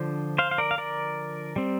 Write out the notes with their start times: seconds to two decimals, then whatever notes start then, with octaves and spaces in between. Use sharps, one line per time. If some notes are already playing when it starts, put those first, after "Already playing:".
Already playing: D3 F3 D4 C5
0.38 C5 F5
0.51 F5
0.58 A#4 D5
0.71 F5
0.78 A#4 D5
1.56 G3 C4